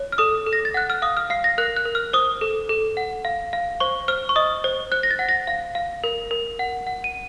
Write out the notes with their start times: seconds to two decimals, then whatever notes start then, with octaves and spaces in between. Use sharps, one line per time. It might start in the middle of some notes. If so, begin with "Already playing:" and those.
Already playing: C#5
0.12 F6
0.18 A4 D#6
0.46 A4
0.53 A#6
0.65 A6
0.74 F#5 F#6
0.90 F6
1.02 F5 D#6
1.17 F6
1.30 F5 C7
1.44 A#6
1.58 A#4 F#6
1.76 F#6
1.85 A#4
1.95 F6
2.13 C5 D#6
2.41 A4
2.69 A4
2.97 F#5
3.25 F5
3.53 F5
3.80 C5 C#6
4.08 C5 F6
4.29 C#6
4.36 D#5 D#6
4.64 C5
4.92 C5 F#6
5.03 A#6
5.11 A6
5.19 F#5
5.29 A#6
5.47 F5
5.75 F5
6.04 A#4
6.31 A#4
6.59 F#5
6.87 F#5
7.04 D#7